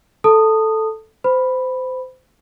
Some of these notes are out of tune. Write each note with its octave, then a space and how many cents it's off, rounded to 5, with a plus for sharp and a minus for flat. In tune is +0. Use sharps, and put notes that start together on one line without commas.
A4 +0 A5 +20 D#6 -10
C5 -25 B5 +0